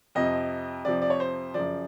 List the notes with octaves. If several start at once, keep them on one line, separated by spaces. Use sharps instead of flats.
F2 C3 F3 D#5
F2 C3 F3 D5
D5
C#5
C5
F#2 C#3 F3 D5